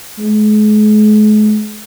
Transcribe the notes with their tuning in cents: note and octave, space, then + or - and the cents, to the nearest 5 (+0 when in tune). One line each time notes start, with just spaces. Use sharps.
G#3 +40